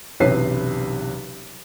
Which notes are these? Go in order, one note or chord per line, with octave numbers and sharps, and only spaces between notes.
F#1 B1 C3 E3 B4 C7